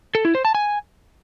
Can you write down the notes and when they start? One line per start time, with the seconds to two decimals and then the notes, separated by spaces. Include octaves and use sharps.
0.15 A4
0.25 E4
0.35 C5
0.45 A5
0.55 G#5